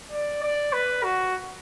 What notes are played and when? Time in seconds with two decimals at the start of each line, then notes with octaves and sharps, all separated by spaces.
0.11 D5
0.43 D5
0.73 B4
1.04 F#4